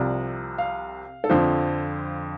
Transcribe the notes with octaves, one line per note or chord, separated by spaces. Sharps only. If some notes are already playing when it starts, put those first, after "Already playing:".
Already playing: C2 C3 F3 D5
F5
A4
F2 D3 F3 C5